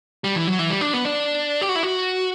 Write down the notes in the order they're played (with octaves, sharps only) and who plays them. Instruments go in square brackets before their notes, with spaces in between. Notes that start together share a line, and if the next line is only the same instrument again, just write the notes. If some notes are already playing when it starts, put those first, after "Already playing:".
[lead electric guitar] G3
E3
F#3
E3
G3
D4
B3
D4
G4
F#4
E4
F#4